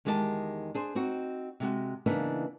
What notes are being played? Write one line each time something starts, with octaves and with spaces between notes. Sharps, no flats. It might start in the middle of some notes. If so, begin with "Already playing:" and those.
E2 D#3 G#3 G4 A4 A5
D4 G#4 C5
C4 D#4 F#4
C3 G#3 F#4
C#3 E3 A#3 B3 D4 D#4